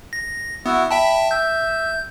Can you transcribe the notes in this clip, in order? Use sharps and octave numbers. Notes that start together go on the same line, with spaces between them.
A#6
B3 E4 F#4 E5
E5 G5 A5 B5
E5 G6